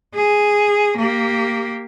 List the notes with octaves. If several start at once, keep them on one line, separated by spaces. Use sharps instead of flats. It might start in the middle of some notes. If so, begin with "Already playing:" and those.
G#4
A#3 G4